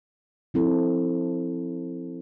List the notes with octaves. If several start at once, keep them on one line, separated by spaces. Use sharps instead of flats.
F3 C4 E4 A4